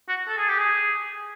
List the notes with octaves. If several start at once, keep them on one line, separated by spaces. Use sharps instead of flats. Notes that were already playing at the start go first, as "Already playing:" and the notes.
F#4
A4
G#4
G4
G#4